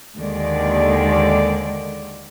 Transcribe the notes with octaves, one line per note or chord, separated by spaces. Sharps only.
D#2 D3 D#3 G#3 D5